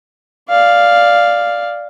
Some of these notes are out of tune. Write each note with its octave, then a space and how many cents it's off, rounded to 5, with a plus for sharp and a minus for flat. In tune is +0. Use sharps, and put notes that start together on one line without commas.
D5 +0 F5 +0